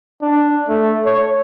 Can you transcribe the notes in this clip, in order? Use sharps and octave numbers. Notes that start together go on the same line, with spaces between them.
D4
A3
C#5